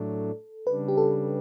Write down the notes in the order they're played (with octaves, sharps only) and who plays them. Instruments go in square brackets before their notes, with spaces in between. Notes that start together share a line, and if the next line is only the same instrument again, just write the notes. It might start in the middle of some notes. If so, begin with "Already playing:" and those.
Already playing: [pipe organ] A2 F#3 A3 D4 [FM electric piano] A4
[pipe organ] C#3 G3 D4 [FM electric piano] B4
[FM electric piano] G4
A4